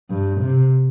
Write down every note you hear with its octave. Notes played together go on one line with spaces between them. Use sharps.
G2
C3